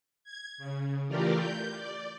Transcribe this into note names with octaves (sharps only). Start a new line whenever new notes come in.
G#6
C#3
E3 A3 F4 G4 A#4 D5
G6
D5